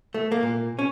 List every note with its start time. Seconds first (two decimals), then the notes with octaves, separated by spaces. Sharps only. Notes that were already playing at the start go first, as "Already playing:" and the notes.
0.14 A3
0.32 A#3
0.43 A#2
0.79 C#4